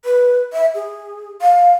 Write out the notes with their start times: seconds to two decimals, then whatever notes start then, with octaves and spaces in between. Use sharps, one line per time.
0.05 B4
0.53 E5
0.75 G#4
1.41 F5